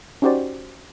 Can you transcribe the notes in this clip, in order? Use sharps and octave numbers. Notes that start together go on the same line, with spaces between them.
C#4 D#4 F#4 G4 C5 D5